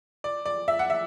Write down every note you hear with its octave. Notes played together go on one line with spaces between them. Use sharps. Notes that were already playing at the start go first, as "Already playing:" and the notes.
D5
D5
E5
F#5
E5